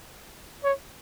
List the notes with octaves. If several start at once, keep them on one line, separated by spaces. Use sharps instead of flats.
C#5